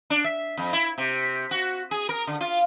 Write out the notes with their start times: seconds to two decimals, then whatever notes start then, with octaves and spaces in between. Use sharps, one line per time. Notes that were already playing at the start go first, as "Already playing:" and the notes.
0.10 D4
0.24 E5
0.58 F2
0.73 E4
0.98 C3
1.51 F#4
1.91 G#4
2.09 A#4
2.27 D3
2.41 F4